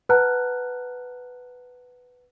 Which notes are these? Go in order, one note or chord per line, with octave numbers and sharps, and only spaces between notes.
B4 F#5 A5 A#5 F6 F#6